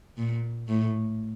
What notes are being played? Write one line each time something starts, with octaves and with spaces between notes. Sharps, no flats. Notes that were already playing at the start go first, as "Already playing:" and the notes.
A#2
A2